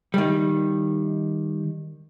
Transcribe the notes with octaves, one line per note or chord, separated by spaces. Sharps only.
D#3 G3